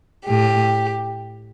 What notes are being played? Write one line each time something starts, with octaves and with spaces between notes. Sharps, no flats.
A2 G4